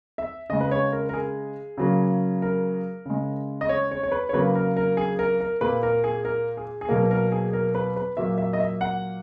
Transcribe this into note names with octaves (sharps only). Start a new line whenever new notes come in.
E5
C#3 G#3 D#5
B4
C#5
A#4
A#4
G#4
C#3 F#3 A#3
A#4
C#3 G#3
D#5
C#5
C#5
C#5
B4
C#5
C#3 F#3 A#3 B4
A#4
A#4
G#4
A#4
A#4
A#2 A#3 B4
A#4
G#4
A#4
G#4
G#4
B2 F#3 A#3 A#4
A#4
G#4
A#4
B4
B4
A#2 F#3 A#3 E5
E5
D#5
E5
F#5